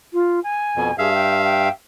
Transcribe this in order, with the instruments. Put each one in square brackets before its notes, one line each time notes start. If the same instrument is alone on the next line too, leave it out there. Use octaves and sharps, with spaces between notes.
[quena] F4
G#5
[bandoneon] F2 B2
[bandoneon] G2 E5 F5 [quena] G#4
[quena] G5
G5